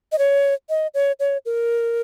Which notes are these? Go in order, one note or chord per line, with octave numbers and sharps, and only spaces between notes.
D#5
C#5
D#5
C#5
C#5
A#4